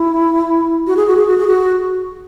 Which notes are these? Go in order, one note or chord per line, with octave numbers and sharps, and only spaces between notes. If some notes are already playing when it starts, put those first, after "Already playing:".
Already playing: E4
F#4
G#4
F#4
G#4
F#4
G#4
F#4